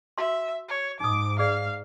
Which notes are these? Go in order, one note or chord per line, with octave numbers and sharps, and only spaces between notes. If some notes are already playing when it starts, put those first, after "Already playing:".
F#4 E5 F5 C6
C#5
G#2 D#4 D6 D#6
G#4 D5 F5